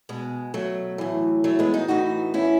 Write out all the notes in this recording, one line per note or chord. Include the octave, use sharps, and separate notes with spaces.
B2 G#3
F#3 A3
A2 E3
F#3 A3
G#3 B3
D#4 F#4
A2 E3 D#4 F#4
C#4 E4